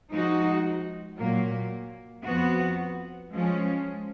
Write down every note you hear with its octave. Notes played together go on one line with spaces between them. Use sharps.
F3 G#3 D#4 F#4
A#2 F#3 A#3
F2 F3 B3 F#4
F3 G#3 C#4